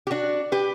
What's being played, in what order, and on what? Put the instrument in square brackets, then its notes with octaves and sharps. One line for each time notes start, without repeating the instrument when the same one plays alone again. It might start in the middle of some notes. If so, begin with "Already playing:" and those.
[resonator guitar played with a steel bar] G4
D4 F#4
G4 B4